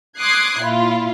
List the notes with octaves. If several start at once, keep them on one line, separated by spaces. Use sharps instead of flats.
C6 D6 D#6 F#6 G#6 C7
A#2 E4 F4